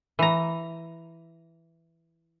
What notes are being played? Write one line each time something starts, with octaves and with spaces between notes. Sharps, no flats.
E3 A#5